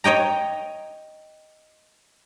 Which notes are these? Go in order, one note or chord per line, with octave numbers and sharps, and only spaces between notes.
C#5 D#5 G5 A#5